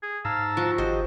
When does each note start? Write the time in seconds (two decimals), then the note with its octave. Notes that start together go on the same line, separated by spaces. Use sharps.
0.02 G#4
0.25 G#2 F5 A5 A#5 E6
0.57 F3 F#4
0.78 G#1 G4 C5 D#5